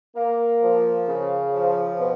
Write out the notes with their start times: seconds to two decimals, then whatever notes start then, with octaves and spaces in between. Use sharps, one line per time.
0.16 A#3
0.62 F3
1.08 C#3
1.54 F3
1.99 B2